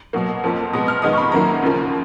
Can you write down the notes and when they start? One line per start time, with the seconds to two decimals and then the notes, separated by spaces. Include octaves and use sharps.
0.13 B2 F#3 A#3
0.44 F2 F3 A#3
0.73 B2 G#3 B3 D#6
0.88 F6
1.02 F2 D#3 G#3 B3 D#6
1.13 C#6
1.17 B5
1.32 F#2 D#3 F#3 A#3 A#5
1.63 D#2 C#3 F3 A#3